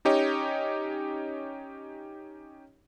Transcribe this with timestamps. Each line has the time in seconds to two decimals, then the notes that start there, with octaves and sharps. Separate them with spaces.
0.05 C#4 D#4 G4 C#5 D#5